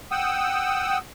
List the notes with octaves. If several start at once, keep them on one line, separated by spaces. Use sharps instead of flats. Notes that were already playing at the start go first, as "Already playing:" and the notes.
F#5 G5 D#6 E6